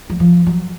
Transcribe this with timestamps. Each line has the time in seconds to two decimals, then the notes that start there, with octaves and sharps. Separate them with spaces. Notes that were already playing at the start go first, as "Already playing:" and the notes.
0.10 F#3
0.20 F3
0.47 F#3